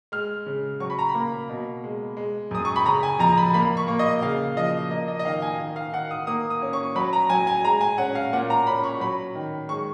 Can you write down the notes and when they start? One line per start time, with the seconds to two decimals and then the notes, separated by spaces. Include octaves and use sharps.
0.12 G#3 F6
0.46 C#3
0.80 F#3 C#6
0.90 B5
0.99 A#5
1.09 B5
1.15 A#3
1.50 B2
1.84 G#3
2.17 G#3
2.51 F#2 D#6
2.65 C#6
2.76 B5
2.86 C#3 A#5
3.03 G#5
3.19 F2 A#5
3.38 B5
3.54 A#3 B5
3.77 C#6
3.88 A#3
3.99 D#5
4.22 C#3 F5
4.57 F3 D#5
4.90 A#3 D#5
5.08 D#5
5.19 D#5
5.25 D#3 F5
5.42 G#5
5.60 D#3
5.76 F5
5.93 D#3 F#5
6.11 D#6
6.27 A#3 D#6
6.50 D#6
6.62 C#4
6.73 C#6
6.96 F#3 B5
7.13 A#5
7.30 F#3 G#5
7.47 G#5
7.64 G#3 A#5
7.81 G#5
7.98 C#4 F#5
8.15 F5
8.33 A#2 F#5
8.50 A#5
8.67 C#4 B5
8.83 C#6
9.00 F#3 B5
9.35 D#3
9.69 G#3 C#6